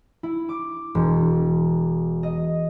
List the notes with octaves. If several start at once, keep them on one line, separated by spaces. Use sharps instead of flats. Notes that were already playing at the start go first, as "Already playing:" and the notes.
E4
D6
E1
D#5